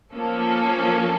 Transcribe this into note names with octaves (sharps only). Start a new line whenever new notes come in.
F3 A#3 C#4 A4